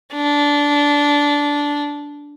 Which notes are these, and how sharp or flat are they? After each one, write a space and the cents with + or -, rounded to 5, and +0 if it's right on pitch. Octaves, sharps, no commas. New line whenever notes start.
D4 -15